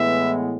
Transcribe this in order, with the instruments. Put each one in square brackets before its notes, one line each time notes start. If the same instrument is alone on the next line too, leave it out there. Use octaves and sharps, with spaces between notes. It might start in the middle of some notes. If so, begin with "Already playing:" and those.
Already playing: [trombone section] A2 E3 G#3 B3 [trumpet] E5